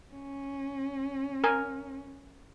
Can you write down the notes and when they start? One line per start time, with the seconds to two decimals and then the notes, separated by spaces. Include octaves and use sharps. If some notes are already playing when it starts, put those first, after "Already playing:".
0.14 C#4
1.44 A#4 G#5